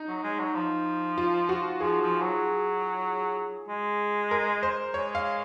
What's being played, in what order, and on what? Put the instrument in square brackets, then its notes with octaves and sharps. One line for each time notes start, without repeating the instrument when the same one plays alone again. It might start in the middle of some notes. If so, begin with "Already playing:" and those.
Already playing: [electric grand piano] D#4
[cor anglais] F#3
G#3
F#3
F3
[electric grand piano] F4
F#4
[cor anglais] F3 [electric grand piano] G#4
[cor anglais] F3
F#3
G#3
[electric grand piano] A#4
C5
[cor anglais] G#3 [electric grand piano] C#5
[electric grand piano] F5